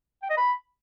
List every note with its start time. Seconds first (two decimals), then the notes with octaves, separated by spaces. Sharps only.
0.23 G5
0.30 D#5
0.37 B5